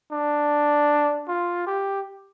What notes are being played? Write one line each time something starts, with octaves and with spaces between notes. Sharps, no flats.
D4
F4
G4